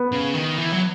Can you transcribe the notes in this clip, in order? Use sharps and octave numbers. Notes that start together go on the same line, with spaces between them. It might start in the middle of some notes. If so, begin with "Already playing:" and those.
Already playing: B3
C#3
D#3
E3
F#3